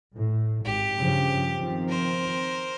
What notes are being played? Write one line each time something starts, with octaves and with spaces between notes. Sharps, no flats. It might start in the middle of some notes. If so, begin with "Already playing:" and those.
A2
G#1 G4
G2 C#3 F3
D#3 F3 C4
A#4 C5